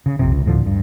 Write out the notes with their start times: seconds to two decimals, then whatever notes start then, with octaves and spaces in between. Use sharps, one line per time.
0.06 C#3
0.19 A#1 F2 C3
0.32 C#2
0.46 D2 A2 D3 F3
0.66 G2